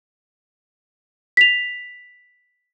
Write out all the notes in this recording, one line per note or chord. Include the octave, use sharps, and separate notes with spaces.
B6 F7